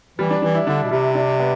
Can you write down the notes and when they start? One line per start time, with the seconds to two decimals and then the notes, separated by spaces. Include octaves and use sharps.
0.19 E3 G3
0.30 D4
0.42 E3 D4
0.54 E4
0.67 D3 D4
0.84 B2
0.91 C3 G3
1.15 D4
1.40 B3